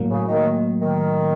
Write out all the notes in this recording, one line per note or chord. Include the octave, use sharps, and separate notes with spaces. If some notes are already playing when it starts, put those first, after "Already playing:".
Already playing: A2 F#3 A#3
C#3
D#3
D#3